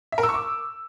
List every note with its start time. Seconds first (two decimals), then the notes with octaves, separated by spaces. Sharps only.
0.12 E5
0.18 A#4
0.23 E6
0.29 C#6
0.34 D6